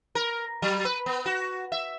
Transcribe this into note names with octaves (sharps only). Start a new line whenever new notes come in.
A#4
F#3
B4
B3
F#4
E5